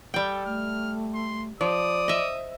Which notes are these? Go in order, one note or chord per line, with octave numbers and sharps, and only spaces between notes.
G3 A4 G5
A3 F6
C6
F3 C5 D5 D#6
D#5 E5